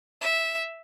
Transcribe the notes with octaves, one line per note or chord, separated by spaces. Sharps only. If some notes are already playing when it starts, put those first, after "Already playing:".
E5